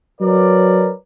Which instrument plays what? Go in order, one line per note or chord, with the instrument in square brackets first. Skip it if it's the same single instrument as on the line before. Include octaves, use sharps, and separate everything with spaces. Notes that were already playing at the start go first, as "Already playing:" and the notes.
[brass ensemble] F#3 A#4 B4 C#5 D5